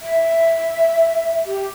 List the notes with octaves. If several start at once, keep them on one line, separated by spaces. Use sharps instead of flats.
E5
G4